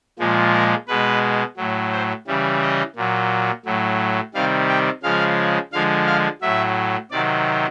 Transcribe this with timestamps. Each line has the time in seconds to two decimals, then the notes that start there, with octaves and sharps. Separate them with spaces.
0.19 A#2 F3 G#3
0.54 A#4
0.88 B2 G#3 B4
1.57 A2 F#3
1.92 C5
2.27 C#3 E3 G3
2.62 D#5
2.96 A#2 F#3
3.65 A2 F#3
4.34 C3 D#3 G3 F5
4.69 G5
5.03 C#3 F3 G#3 F5
5.73 D3 F3 G#3 F5
6.07 F5
6.41 A2 F#3 E5
7.11 C3 D#3 F#3 D5